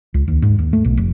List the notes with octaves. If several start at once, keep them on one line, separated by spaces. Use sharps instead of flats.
C#2
D#2
G#2
D#2
A3
B1
F1